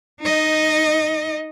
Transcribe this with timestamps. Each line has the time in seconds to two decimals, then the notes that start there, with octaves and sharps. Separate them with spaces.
0.21 D#4 D#5